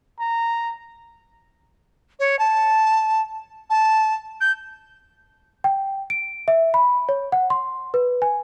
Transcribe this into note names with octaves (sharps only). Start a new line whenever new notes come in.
A#5
C#5
A5
A5
G6
G5
D7
E5
B5
C#5
F#5
C6
B4
G#5